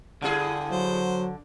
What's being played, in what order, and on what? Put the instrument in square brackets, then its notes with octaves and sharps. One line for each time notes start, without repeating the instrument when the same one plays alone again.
[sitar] G2 E4 G#4 [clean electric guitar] D3
[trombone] F#3 [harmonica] C5